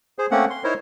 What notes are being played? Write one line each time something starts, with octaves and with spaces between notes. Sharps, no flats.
G#4 C5
A3 A#3 C4 C#4 F#5
C6
D#4 E4 A#4 C5 C#5